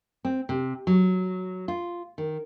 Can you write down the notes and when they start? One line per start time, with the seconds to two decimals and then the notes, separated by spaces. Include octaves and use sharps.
0.25 C4
0.49 C3
0.87 F#3
1.68 F4
2.18 D#3